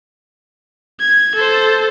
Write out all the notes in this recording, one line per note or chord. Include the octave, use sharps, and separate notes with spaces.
G#6
A4 C5